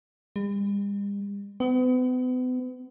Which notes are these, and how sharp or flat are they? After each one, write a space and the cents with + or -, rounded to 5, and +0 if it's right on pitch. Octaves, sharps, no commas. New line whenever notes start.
G3 +45
B3 +40